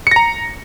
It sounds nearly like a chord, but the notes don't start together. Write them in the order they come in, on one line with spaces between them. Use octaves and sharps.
C#7 A#6 A#5